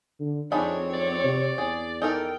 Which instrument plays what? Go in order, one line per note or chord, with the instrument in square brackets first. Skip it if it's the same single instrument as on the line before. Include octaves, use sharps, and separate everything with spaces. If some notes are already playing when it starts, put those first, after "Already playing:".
[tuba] D3
[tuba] F2 [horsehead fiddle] C4 C#5 [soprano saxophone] D4 [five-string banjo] D#4 G#4 B5
[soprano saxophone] D5
[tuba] C3
[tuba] E2 [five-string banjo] G#4
[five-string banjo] D#4 A4 A#4 [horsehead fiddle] G5